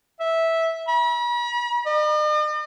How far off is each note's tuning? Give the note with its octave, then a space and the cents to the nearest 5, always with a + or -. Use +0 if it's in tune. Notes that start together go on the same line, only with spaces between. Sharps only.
E5 -10
B5 -45
D#5 -45